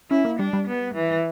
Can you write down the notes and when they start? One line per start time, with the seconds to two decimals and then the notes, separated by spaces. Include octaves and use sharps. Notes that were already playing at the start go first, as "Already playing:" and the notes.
0.10 C#4 E4
0.25 A#3
0.39 G3 D4
0.53 G3
0.68 B3
0.95 E3